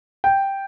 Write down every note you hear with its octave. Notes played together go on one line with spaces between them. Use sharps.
G5